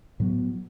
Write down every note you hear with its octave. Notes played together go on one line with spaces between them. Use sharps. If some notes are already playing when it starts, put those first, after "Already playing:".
A2 F#3 B3